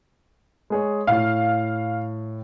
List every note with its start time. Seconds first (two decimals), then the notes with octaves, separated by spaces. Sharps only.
0.70 G#3 G#4 C#5
1.07 A2 F5